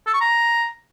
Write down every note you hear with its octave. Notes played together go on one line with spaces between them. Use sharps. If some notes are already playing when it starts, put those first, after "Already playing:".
A4
C#6
A#5